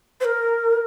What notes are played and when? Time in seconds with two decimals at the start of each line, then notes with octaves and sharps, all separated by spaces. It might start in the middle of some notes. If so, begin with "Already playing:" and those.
0.20 C5
0.24 A#4